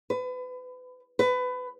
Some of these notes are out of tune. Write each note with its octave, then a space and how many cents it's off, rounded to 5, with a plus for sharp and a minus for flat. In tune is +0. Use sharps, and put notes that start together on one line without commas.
B4 +30
B4 +25